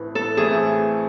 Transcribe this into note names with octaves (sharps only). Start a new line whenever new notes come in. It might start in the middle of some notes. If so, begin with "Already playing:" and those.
Already playing: A1 A2 E3 A3 C4 B4
A4
A1 A2 E3 A3 C4 G#4